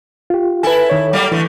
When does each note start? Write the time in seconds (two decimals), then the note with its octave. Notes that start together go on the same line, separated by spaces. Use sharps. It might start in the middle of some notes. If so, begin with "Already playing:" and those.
0.30 F4 G4
0.63 E4 A4 B4 G#5
0.90 D#3 C#5
1.13 F#3 G3 A#3
1.32 D3 E3 A3